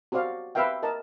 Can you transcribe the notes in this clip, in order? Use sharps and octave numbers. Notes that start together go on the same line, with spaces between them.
F#4 G4 C5 D5 F5
G4 B4 E5 F5 G5
A#4 D#5 A5